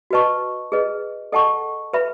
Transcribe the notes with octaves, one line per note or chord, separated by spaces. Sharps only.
F#4 B4 D#5 A5 C#6
G#4 B4 D#5
A4 D#5 F#5 A5 C#6
B4 E5 B5